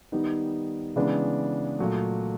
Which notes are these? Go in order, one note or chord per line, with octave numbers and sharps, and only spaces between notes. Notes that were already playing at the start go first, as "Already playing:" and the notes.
D#3 G3 B3 D#4
C#3 E3 G#3 B3 D4
A#2 F#3 A3